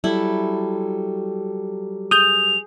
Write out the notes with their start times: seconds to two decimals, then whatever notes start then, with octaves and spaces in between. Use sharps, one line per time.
0.04 F#3 G3 E4 A4
2.11 G#4 D#6 G6 F7